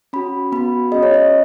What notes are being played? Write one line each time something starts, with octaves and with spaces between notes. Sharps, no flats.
C#4 F#4 B5
B3 F#4 B5
C#4 G#4 D#5
C#5
D#5